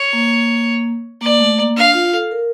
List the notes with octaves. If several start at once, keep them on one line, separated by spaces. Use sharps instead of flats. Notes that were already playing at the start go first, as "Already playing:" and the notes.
Already playing: C#5
A#3
A#3 D5
A3
A#3
D4 F5
F4
A4
A#4